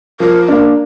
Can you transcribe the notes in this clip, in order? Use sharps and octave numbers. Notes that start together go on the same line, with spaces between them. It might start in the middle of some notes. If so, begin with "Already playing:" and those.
F3 A#4
A#3 D4